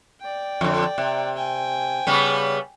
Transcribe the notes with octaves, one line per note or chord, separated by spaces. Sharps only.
D5 G5
F2 D3
C3
G5 G#5
C#3 G3 B3